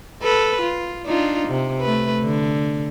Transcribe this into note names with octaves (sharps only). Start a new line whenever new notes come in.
A4 B4
F4
D4 D#4 F4
C3
A3 B4
D3